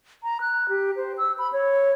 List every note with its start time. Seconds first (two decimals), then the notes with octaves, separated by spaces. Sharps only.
0.23 A#5
0.41 F#6
0.69 G4
0.96 C5
1.18 E6
1.38 B5
1.53 C#5